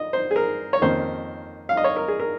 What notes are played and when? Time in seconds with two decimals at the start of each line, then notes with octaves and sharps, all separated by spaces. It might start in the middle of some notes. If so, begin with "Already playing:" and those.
Already playing: D#5
0.13 C5
0.31 G#4
0.36 A#4
0.73 C#5
0.82 F2 D#3 A#3 C#4 C5
1.69 F5
1.77 D#5
1.84 C#5
1.96 A#4
2.08 G#4
2.20 A#4